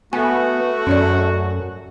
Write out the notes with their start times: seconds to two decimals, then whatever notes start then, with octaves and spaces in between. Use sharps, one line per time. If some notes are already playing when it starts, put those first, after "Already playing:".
0.13 A3 B3 F#4 G#5
0.87 F#2 C#4 C#5 D5